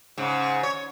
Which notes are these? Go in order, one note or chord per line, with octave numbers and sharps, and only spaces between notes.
G#2 C#3
C#5